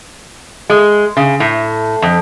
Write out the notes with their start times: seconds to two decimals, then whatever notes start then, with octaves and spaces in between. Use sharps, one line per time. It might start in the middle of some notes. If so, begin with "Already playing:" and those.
0.69 G#3
1.17 C#3
1.40 A2
2.02 F2